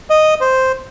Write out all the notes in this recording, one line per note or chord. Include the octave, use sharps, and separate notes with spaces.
D#5
C5